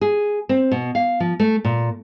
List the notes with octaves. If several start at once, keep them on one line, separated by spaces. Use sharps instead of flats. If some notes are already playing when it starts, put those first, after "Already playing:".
G#4
C4
B2
F5
F3
A3
A#2